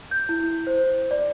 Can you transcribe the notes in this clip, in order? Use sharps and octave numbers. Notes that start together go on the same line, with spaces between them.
G6
E4
C5
D5